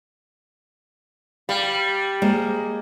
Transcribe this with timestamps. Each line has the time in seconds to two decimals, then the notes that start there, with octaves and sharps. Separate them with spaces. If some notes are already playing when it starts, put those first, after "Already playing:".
1.49 G3 F5
2.22 G#3 A#3 C5